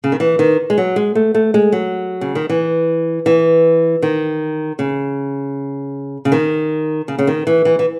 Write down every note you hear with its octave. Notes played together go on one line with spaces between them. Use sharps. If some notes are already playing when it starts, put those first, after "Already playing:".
C#3
D#3
E3
D#3
G#3
F#3
G#3
A3
A3
G#3
F#3
C#3
D#3
E3
E3
D#3
C#3
C#3
D#3
C#3
C#3
D#3
E3
E3
E3